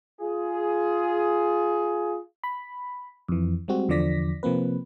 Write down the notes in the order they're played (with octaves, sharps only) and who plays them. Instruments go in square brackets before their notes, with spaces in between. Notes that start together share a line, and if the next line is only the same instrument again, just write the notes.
[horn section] F4 G#4
[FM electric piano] B5
F2 E3
G3 G#3 C4 F#4
E2 D3 F3 D5 A#6 B6
C3 F3 A#3 C4 B4